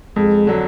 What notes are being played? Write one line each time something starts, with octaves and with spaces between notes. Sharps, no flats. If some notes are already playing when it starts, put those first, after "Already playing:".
F2 G#3
D3 F#3